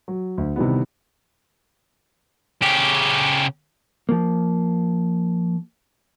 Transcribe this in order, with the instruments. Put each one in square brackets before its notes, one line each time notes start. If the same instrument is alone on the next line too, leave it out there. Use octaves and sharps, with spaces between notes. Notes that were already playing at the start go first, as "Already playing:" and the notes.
[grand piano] F#3
D2
C3 D#3 E3 G3 B3
[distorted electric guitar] C#3 G4
[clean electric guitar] F3 A#3